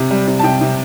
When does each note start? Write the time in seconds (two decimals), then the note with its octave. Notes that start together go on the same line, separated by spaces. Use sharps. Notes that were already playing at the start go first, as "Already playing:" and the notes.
Already playing: C3
0.11 G3
0.27 C3
0.39 A5
0.44 C3 G5
0.61 C3